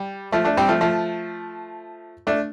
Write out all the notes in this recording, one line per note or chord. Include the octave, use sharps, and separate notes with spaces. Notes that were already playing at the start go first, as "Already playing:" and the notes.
Already playing: G3
F3 A3
A3 D4
G3 C4
F3 A3
F3 A3
A3 D4